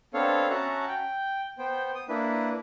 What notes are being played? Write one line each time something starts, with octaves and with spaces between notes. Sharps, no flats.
B3 C4 D4 A4 C#5 F5
C#4 F#4 E5 F#5 A5 A#5
G5
B3 C5 G5
D#6
A#3 D4 E4 B4